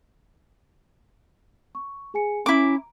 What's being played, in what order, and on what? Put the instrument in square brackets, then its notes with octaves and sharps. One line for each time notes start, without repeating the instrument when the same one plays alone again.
[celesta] C#6
G#4 G#5 C#7
[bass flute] C#4 [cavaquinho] E4 D6 [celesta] A#5